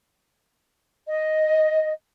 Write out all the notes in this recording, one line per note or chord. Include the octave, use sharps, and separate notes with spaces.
D#5